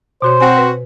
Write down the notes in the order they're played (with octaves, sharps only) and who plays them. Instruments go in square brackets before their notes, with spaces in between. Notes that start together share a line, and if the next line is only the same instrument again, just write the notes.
[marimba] B2 F#4 C#5 [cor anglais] C5
[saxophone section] C4 F#4 [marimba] G#5
[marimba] B4